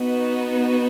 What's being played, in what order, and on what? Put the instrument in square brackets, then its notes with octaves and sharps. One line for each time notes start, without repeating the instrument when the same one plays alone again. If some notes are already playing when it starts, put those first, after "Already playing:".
Already playing: [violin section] B3 D#4 F#4